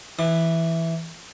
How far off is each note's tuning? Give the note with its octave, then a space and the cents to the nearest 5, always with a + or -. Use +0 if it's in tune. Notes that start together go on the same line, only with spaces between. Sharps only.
E3 +0 D6 +35